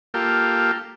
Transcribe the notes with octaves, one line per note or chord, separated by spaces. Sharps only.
A#3 F4 G4 A4